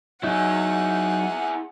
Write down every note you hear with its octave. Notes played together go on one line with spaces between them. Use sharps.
F#3 D#4 E4 G#4 F#5